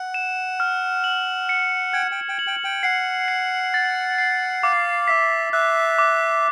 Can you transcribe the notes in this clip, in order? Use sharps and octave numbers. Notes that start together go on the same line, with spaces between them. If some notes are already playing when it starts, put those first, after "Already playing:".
Already playing: F#5
E7
F6
F#7
C#7
G5 G#6
G5
G5
F#7
G5
G5
F#5 C7
C7
A6
C7
F5 D6
E5 B6
E5 F#6
D6